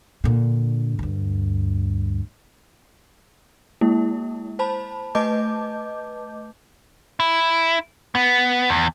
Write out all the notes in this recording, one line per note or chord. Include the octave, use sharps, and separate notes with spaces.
A#2 D3
D2 G2
G#3 A#3 E4
C5 A5 B5
A3 B4 D#5 A5 D6 G6
E4
B3
E2